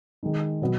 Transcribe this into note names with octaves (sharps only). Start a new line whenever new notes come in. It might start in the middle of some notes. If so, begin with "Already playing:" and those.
D#3 G#3 D#4
B2 F#3 B3